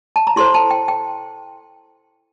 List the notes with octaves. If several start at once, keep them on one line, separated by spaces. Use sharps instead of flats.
A5
A#5
E4 A4 C5 C6
A5
G5
G5